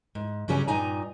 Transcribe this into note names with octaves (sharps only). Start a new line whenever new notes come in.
G#2
G2 C#3 F#3 G3 C#4
G2 A#2 D#4 G#5 A#5